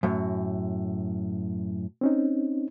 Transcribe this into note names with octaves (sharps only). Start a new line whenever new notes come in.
F#2 A2
C4 C#4 D#4